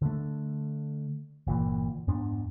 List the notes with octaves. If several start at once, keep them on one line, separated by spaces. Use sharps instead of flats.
D3 A3
G1 A#2 E3
F2 G#2 B3 D4